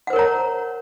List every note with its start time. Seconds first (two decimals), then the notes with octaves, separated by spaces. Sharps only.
0.07 F#5
0.10 C5
0.13 A#4
0.16 C#5
0.19 A#5